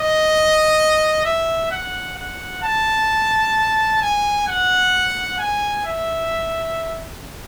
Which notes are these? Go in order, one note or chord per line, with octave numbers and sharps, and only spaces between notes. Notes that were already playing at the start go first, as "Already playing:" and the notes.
Already playing: D#5
E5
F#5
F#5
A5
G#5
F#5
G#5
E5